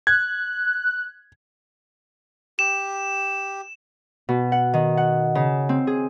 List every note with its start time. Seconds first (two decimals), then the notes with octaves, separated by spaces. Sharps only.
0.07 F#6 G#6
2.59 G4 E7
4.29 B2
4.52 F#5
4.74 D#3
4.97 F#5
5.35 C#3
5.69 C4
5.87 G#4